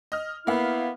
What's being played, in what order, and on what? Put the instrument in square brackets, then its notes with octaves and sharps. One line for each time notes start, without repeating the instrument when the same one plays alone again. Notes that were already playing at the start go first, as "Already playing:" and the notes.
[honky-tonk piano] D#5 F6
[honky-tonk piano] A#3 F5 [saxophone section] B3 E4